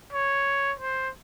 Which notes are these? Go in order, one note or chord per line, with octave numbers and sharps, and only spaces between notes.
C#5
C5